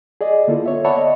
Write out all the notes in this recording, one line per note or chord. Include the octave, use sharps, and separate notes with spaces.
G#4 D5 D#5
D3 A#3 E4 F4 A4
B3 C#5 E5
C#5 D5 E5 F#5 A5 B5
D#5